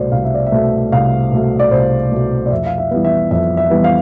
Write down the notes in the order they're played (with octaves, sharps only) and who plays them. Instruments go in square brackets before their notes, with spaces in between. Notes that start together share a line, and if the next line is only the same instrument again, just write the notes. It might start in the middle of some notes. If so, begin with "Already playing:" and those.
Already playing: [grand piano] C2 B2 A3 C5 D5
C2 F5
E5
D5
E5
B2 A3
C2 F5
B2 A3
D5
C2 C5
B2 A3
D5
F2 E5
F5
E5
E3 G3 B3
E5
F2 E5
E5
E3 G3 B3
F5